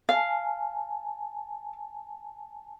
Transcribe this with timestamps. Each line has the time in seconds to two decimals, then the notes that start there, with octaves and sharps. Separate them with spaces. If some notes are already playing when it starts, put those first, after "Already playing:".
0.09 F5 G#5 A5